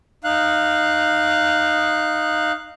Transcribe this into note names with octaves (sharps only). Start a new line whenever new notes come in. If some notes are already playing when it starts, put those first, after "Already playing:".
D#4 F5 F#6